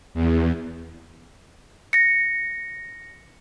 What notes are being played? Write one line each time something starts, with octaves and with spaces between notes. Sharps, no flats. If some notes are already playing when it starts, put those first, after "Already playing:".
E2
A#6 C#7